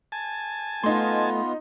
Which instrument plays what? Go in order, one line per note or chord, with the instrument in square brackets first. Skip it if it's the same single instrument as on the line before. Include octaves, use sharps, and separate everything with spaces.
[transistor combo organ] G#5 A5
[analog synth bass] A3 [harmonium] B3 F4 [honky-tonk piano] D#4 C6